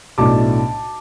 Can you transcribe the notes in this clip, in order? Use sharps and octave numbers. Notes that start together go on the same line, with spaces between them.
B1 A2 A3 D4 A5 D6